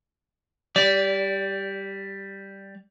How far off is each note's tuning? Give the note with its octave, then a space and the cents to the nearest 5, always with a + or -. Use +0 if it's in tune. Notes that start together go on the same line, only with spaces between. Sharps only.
G3 +0 D5 -25